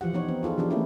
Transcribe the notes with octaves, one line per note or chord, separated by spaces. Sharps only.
E3 F3 F4 G4 F#5
F3 B3 D#4 C#5
C4
D#4 F4 G#4 A4
E3 F3 D4 G4
A3 A#3 C#4 E4 F4